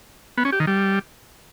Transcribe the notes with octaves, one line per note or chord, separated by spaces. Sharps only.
B3
C#4
G4
D#3
G3